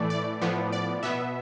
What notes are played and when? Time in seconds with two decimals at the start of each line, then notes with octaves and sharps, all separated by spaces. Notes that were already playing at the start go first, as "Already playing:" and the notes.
Already playing: A2 E3 A3 D5
0.10 D5
0.41 A2 F3 B3
0.72 D5
1.03 B2 B3 E5